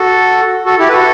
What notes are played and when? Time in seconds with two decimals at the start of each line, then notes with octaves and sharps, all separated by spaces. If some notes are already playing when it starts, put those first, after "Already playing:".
Already playing: F#4 A4
0.65 F#4 A4
0.79 E4 G4
0.89 B4
0.92 F#4 A4